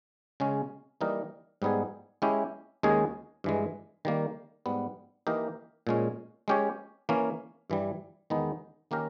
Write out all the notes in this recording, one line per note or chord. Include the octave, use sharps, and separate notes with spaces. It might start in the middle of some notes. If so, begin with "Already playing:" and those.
C#3 G#3 C#4
E3 G3 A#3 D#4 A#4
G#2 G3 B3 D#4 G#4
G#3 C#4 E4 G4
D#2 D#3 G#3 C#4 G#4
G2 E3 G#3
D#3 G3 A#3
G#2 G3 B3
E3 A#3 D#4 G4 A#4
A#2 G#3 C#4
G#3 C#4 G4 C#5
E3 A#3 C#4
G2 E3 G3
E2 D#3 G#3 B3 D#4
D#3 A#3 C#4 G4 A#4